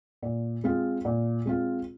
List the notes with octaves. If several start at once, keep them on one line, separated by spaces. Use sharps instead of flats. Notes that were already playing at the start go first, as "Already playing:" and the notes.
A#2
G#3 C4 F4
A#2
G#3 C4 F4